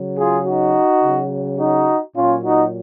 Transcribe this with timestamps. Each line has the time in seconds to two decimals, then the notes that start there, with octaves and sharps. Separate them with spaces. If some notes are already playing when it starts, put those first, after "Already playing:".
Already playing: C#3 F#3
0.17 F4 G#4
0.45 D#4 F#4
1.02 C#3 F#3
1.58 D#4 F#4
2.15 A#2 F#3 C#4 F4
2.43 D#4 F#4